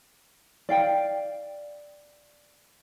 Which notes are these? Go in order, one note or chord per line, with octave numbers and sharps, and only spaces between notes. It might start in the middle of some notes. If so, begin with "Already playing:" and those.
D5 F5 G5